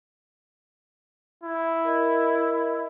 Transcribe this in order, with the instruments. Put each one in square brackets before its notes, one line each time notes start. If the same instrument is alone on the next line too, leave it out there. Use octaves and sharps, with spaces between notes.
[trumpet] E4
[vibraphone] A#4 D#5